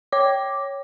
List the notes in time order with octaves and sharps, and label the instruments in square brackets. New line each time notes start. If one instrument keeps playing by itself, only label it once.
[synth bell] C#5 D6